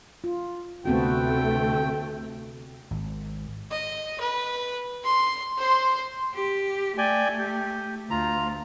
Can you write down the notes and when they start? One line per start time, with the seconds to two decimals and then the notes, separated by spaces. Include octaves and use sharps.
0.24 F4
0.85 D2 C3 A3 B3 C4 F#4 G5
2.91 G#1
3.71 D#5
4.20 B4
5.04 C6
5.58 C5 C6
6.35 G4
6.98 A3 D5 G5 G#5
7.39 G4
8.10 D2 F4 A#5